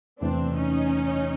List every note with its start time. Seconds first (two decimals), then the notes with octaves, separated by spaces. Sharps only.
0.20 E2 C3 E3 A3 C4 D4
0.54 C#4 D#4